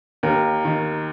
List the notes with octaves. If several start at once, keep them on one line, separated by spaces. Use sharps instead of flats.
D#2 A#4
D#3